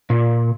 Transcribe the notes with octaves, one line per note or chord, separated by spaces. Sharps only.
A#2